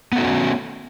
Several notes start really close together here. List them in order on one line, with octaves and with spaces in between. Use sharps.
B3 A3 F#4 D#4 C#4